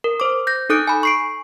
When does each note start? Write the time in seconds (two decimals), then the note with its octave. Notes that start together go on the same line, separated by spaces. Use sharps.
0.04 A#4
0.20 C5 D6
0.47 G6 A#6
0.70 D#4 A4 D#6 F#6 G6 D7
0.87 G#5 B5
1.03 C#6 C7 D7